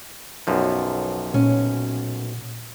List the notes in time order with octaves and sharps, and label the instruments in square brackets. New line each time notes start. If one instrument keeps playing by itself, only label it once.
[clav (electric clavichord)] B1 F#2 F3
[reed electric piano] A#2 [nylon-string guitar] C#4